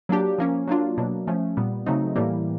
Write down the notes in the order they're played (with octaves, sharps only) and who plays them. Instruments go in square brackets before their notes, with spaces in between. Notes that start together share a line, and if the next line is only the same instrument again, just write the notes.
[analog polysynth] F#3 A#3 D4 G4
F3 A#3 C#4
F#3 A#3 D4 F4
B2 F#3 A#3 D4
F3 A3 C#4
A#2 G3 B3
C#3 F#3 A3 C4 D#4
A2 E3 G3 A#3